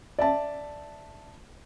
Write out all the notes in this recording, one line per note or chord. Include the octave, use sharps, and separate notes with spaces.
D5 E5 A5